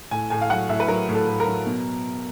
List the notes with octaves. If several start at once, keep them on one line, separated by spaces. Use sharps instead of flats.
A2 G#5
A2 G#5
F5
F#3 F#5
A2 E5
B4
F#3 A#4
A2
A4
A2
A#4
F#3
B2